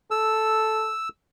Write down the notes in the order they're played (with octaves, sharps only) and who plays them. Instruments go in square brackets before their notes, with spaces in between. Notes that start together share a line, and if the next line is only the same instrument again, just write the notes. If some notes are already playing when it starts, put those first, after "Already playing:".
[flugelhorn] A4 [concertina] E6